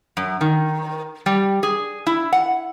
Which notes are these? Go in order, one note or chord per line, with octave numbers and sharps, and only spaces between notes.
F#2
D#3
G3
G#4
E4
F#5